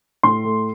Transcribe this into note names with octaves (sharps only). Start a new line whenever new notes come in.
A2 C6
A3